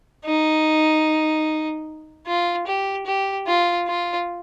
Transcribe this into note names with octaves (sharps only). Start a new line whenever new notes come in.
D#4
F4
G4
G4
F4
F4